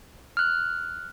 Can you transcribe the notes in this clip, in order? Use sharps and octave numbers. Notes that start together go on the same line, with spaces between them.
F6 F#6